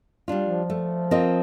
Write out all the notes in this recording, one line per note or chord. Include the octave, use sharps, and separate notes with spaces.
G3 D4 F4
F3
A3
C4 F4 A#4 D#5